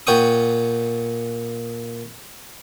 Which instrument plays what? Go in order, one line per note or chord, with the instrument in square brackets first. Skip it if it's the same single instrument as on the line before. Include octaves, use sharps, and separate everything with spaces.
[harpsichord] A#2 C#5 F#5 G5 C#6 D#6